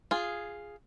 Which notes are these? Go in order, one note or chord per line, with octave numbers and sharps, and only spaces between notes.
F4 G#4